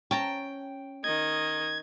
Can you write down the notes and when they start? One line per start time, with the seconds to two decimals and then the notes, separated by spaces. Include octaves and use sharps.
0.11 C#4 G5 A5 A#5
1.04 D#3 D#5 G#6